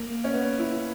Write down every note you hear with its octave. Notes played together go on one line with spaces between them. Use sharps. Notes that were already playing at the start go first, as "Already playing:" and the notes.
Already playing: A#3
C#4
B3
E4